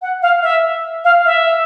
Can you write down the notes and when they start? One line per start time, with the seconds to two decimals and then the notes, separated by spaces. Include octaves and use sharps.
0.02 F#5
0.22 F5
0.42 E5
1.04 F5
1.26 E5